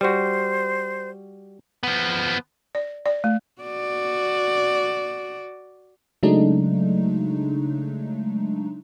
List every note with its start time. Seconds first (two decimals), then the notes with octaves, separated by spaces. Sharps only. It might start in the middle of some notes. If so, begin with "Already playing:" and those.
0.01 G3 F#4 C5
1.83 F3 B3
2.75 D5
3.06 D5
3.24 A3
3.61 F#4 D5
6.23 C#3 F#3 G#3 A3 D4 D#4